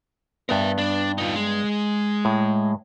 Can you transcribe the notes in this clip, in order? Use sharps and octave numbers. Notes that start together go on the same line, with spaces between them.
G2 B3 A#4 E5
D4
D#4 F4
G#3
A2